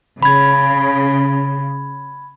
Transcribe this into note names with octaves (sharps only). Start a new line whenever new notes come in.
C#3 B5 G#6